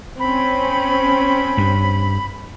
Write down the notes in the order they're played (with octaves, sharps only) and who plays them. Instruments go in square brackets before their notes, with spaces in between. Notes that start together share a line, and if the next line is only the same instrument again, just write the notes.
[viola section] C4 C#4 [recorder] B5
[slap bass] G2